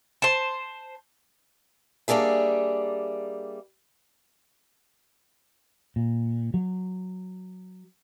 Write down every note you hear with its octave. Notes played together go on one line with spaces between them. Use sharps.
C5 A5
G3 A#3 D4 G#4 E5
A#2
F#3